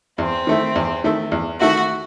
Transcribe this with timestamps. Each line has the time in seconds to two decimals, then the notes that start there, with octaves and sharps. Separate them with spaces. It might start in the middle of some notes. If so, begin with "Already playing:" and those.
0.18 E2 C4
0.47 D#3 A3 E4
0.75 E2
1.04 D#3 A3 E4
1.32 E2
1.60 D#3 A3 E4 F#4